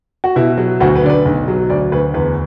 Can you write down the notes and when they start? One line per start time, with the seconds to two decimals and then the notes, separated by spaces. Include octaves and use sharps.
0.24 F#4
0.36 B2 E4
0.58 F#3
0.80 D2 F#4
0.96 B4
1.03 D3 D5
1.10 B4
1.25 B1
1.48 F#3
1.70 D2 D5
1.92 D2 B4
2.14 E2 B4